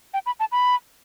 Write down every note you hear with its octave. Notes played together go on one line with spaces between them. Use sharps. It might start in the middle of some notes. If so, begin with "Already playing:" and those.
G5
B5
A5
B5